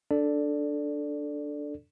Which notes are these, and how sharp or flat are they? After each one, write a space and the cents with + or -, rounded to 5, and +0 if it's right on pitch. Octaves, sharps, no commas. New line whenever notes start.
D4 +0 A4 +0 D5 +0